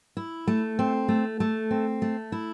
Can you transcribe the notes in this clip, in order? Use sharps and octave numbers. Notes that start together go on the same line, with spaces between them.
E4
A3
C4
A3
A3
C4
A3
E4